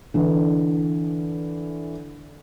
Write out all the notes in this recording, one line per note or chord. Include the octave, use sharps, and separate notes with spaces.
D3 E3